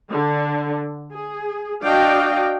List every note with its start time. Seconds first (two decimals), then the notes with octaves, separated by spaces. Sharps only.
0.11 D3
1.13 G#4
1.84 D4 F#4 D5 D#5 F5 G5